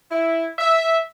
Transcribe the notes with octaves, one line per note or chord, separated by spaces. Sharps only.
E4
E5